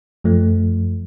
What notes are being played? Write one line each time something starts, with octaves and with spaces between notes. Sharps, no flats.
F#2 F3 A3